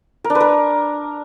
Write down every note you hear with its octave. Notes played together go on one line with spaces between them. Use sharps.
A#4
D4
B4
A#4